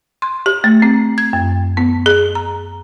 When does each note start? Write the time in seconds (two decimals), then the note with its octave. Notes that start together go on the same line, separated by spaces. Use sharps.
0.22 C6
0.46 G4
0.64 A3
0.82 C4
1.18 G#6
1.33 F#2
1.77 B3
2.06 G#4
2.35 A#5